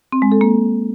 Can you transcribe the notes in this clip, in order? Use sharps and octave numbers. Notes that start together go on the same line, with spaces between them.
C4
G#3
A4
A#3